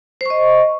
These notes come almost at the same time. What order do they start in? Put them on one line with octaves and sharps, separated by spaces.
C5 C#6 D#5